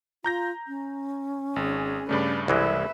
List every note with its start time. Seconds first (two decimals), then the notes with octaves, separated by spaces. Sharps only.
0.24 F4 A#5 G6 A#6
0.68 C#4
1.56 G#1 G#4
2.09 G2 C#3 A3 B4 D5
2.48 C2 E3 G#3 B4 E5